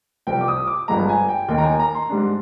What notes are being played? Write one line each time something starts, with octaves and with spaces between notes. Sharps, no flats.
C2 C3 F3 C4 G5
D6
D#6
D6
G1 G2 F3 G#3 A#5
G#5
G5
D#2 D#3 A#3 D#4 G5
A#5
G#5
A#5
C6
G#2 G3 D4